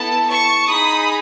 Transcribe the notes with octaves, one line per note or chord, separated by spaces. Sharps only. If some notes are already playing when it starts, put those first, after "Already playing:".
Already playing: B3 E4 A4 A5
A5 C#6
D#4 G#4 B5 D#6